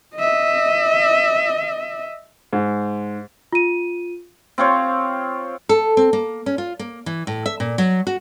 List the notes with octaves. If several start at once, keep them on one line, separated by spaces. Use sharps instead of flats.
D#5 E5
G#2
F4 D#7
C4 F4 C5 C#5
A4
C4
A#3
C#4
F4
A#3
E3
A2
E5
A#2
F#3
F#4